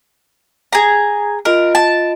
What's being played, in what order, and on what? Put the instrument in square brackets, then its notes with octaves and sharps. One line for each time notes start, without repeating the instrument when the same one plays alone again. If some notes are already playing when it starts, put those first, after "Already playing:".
[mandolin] G#4 A#5
[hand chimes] F4 D#5 D7 [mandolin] A#4
[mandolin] A5